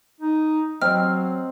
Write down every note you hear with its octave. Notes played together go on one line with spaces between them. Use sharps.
D#4
F#3 C4 D#5 F6